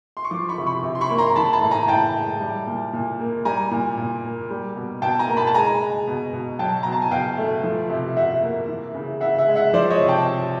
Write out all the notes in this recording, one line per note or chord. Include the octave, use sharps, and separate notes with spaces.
C6
C#6
F3 C6 D6
B5 C#6
C3
B5 C#6
C3
C6
B5 C#6
A#3
A#5 C6
E3 A5 B5
A5 B5
A2
G#5 A#5
A2 G5 A5
G#3
G3
A#2
A#2
A#3
G3 G#5 A#5
A#2
A#2
A#3
G3
B2
B2 G5 A5
G#5 A#5
A#3
A5 B5
A5
G#3 G#5 A#5
G#3
B2
B2
F#3 G5 A5
B2 A#5
A5
G#5
B2 F5 G5
A3
F3
C3
C3 E5 F#5
A#3
E3
C#3
C#3 E5 F#5
E5 F#5
G#3
E5 F#5
F3 C5 D5
C#5 D#5
C3
G5 A5
C3